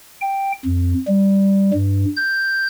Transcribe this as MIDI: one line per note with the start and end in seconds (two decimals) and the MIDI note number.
0.21 0.52 79
0.66 0.94 41
1.07 1.71 55
1.73 2.05 43
2.16 2.67 91